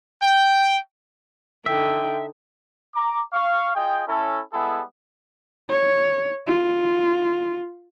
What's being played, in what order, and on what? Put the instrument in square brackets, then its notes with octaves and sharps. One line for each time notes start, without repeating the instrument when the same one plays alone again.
[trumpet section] G5
[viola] D3 D#4 [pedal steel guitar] E5 [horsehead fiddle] G5
[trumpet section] A#5 D6
F5 C#6
F4 G#4 D#5 G5
C#4 E4 A4
G3 G#3 B3 E4 G#4 A4
[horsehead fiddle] C#5
F4